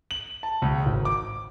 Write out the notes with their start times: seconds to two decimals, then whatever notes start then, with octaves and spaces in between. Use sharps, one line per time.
0.11 F#7
0.43 A5
0.62 C#2
0.86 G#1
1.05 D6